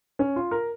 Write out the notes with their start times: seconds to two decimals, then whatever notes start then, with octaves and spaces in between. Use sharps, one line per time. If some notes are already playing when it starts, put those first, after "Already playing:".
0.19 C#4
0.36 F4
0.51 A#4